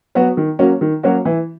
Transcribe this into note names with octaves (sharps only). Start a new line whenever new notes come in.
F#3 B3 F#4
D#3
F#3 A#3 C#4 F#4
D#3
F#3 A#3 C#4 F#4
E3